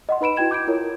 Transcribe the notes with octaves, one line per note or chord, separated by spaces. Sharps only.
D#5 F#5 C6
D#4 B4 B5 D7 E7
E4 F#4 G5 G#6 E7
D6 G6 G#6 D7
E4 F4 A#4 C#5